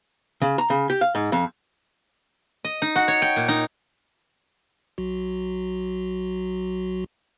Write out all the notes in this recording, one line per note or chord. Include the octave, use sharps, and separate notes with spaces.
C#3
A#5
C#3
G4
F5
G#2
F2
D#5
D#4
F#4
C#5
G5
A#2
D#4
B1 F#3 F#4